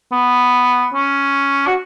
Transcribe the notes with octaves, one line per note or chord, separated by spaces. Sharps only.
B3
C#4
F#4